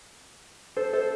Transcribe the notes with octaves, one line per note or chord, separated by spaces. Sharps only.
A4 C5
A4 C5